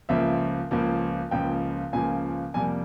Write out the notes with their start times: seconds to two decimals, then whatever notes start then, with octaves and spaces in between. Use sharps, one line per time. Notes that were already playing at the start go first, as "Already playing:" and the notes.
0.09 C#2 C#3 F3 A#3 E5
0.71 C#2 C#3 F3 A#3
1.31 C#2 C#3 F3 A#3 G5
1.93 C#2 C#3 F3 A#3 G#5
2.54 F2 C3 G3 A#3 G#5